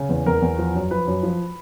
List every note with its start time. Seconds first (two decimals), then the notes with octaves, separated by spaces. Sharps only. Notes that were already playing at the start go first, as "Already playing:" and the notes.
Already playing: C#3
0.09 E2
0.26 E2 A#4
0.42 E2
0.58 F3
0.75 F#2
0.91 F3 B4
1.07 F#2
1.23 F3